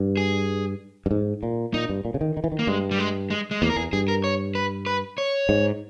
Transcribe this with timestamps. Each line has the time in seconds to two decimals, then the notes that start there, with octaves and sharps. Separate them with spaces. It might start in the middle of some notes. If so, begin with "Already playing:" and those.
Already playing: G2
0.17 G#4
1.06 G2
1.11 G#2
1.43 A#2
1.74 A#2 D#4
1.89 G2
2.05 A#2
2.14 C#3
2.21 D#3
2.37 D#3
2.44 E3
2.52 D#3
2.59 A#3
2.67 G2 G#3
2.91 G3
2.99 G#3
3.30 G#3
3.51 G#3
3.62 E2 A#3
3.70 A#4
3.76 E2 G#4
3.93 G2 G#4
4.08 A#4
4.24 C#5
4.55 B4
4.86 B4
5.18 C#5
5.49 G#2